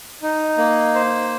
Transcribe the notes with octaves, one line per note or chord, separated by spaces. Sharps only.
D#4
A#3
C5